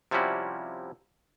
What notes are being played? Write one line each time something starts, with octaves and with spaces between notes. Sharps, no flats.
C3 F3 G3 C#4 E4 F#4